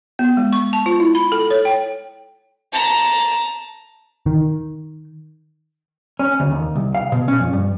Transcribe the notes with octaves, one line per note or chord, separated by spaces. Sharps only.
B3
G#3
C#6
A5
F4
E4
B5
A4
C#5
G5
A5 A#5
D#3
C#4
D2
D#2
C2
F5
B2
C#4
F2
G2